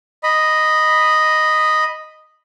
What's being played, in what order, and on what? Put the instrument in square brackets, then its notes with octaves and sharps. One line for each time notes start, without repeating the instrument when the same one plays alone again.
[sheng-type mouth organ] D#5 B5